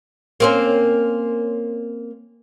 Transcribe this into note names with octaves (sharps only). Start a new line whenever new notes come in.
A#3 C4 C#4